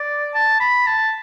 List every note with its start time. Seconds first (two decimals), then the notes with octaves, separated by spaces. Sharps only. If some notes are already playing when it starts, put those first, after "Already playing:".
Already playing: D5
0.34 A5
0.60 B5
0.87 A5